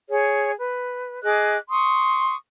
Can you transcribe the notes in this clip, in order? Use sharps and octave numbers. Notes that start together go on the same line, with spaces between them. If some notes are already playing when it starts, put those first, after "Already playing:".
G#4 C#5
B4
G#4 D#5 D6 F#6
C6 C#6 D#6